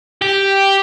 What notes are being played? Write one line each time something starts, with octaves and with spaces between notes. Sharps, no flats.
G4